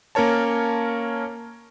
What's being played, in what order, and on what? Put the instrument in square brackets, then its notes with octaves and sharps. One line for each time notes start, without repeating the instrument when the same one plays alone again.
[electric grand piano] A#3 C#4 A#4 C#5 A5